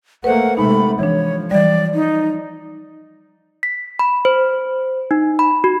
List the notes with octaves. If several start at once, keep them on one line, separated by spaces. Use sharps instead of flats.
A3 A#3 B4 C5 F#5
C3 G#3 A3 D#4 B5
E3 F3 D4 C#5
E3 G3 D5
D#4
B6
B5
C5
D#4
B5
F#4